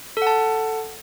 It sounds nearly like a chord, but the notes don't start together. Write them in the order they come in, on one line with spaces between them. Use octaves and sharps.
A4 F#5 A5